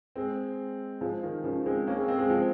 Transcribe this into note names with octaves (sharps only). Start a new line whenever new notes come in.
G#3 C4
F3 G#3
D#3
C#3 F3
G#3 C4
A#3 C#4
G#3 C4
G#3 C4
G#3 C4
F3 G#3